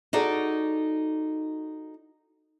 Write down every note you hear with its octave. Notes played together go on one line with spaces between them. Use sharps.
D#4 F#4 G#4 A4 D5